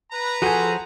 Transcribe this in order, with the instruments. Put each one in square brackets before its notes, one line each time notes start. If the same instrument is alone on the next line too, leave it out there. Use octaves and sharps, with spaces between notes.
[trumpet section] B4 A#5
[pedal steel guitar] F3 G#4 C5 [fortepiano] F#4 G#5 [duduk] A4